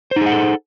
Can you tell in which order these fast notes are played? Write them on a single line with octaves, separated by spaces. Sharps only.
C5 D#4 G#4 F#5 A4